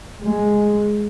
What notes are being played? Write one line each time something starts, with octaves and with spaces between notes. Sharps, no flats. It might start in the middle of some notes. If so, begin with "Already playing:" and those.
G#3